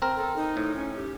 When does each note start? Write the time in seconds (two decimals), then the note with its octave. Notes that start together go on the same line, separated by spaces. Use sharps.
0.02 C4 A#4
0.17 A4
0.36 D#4
0.57 A2
0.75 C#4
0.96 G4